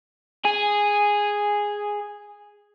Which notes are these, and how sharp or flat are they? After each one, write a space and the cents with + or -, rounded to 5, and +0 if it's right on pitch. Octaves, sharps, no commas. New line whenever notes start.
G#4 -5 G#5 -10